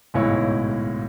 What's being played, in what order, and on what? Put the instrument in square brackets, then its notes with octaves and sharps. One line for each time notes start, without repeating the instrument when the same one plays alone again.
[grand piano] D1 B1 G#2 E4 C#5